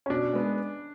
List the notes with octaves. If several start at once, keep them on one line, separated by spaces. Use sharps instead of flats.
C#4
B2 D4
G#3 B3